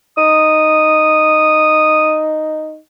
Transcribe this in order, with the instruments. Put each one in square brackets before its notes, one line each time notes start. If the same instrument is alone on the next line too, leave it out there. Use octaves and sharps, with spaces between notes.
[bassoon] D#4 [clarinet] D#6